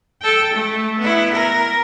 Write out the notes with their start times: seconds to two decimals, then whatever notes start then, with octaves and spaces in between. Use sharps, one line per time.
0.22 A4 G5
0.54 A3
0.99 B3 E4
1.33 A#4